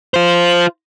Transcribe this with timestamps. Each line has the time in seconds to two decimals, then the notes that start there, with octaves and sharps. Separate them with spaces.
0.14 F4 C5